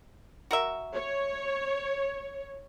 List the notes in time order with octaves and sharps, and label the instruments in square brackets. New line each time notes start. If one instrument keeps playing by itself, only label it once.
[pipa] F#4 A#4 E5
[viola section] C#5